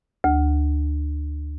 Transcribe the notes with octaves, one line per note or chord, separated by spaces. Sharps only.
D2